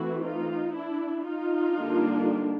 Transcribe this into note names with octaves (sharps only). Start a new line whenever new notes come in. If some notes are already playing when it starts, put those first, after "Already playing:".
Already playing: E3 A3 C4 E4 F#4
D#4 F4
D4 E4
D#4 F4
D3 G3 A#3 D4